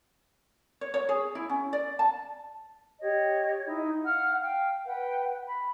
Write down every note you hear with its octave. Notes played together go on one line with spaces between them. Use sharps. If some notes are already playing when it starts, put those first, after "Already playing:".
C#5
C#5
G#4
E4
C#4
D5
A5
G4 C#5 D#5
D#4 E4
F5 F#5 F6
F5 G5
B4 F#5 G5
B5